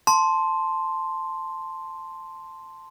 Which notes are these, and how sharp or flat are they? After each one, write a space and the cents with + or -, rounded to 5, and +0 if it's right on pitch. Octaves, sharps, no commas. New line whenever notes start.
A5 +0 C6 +0